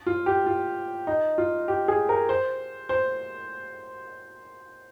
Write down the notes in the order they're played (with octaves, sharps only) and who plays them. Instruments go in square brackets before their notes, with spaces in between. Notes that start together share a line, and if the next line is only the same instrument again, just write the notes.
[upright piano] F4
G4
F4
D#4
F4
G4
G#4
A#4
C5
C5